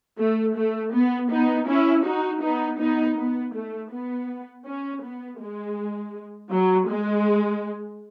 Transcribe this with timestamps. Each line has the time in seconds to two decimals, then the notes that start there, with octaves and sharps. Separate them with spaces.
0.19 A3
0.56 A3
0.93 B3
1.30 B3 D#4
1.68 C#4 E4
2.05 D#4 F#4
2.42 B3 D#4
2.79 B3 D#4
3.17 B3
3.53 A3
3.90 B3
4.66 C#4
5.03 B3
5.40 G#3
6.51 F#3
6.89 G#3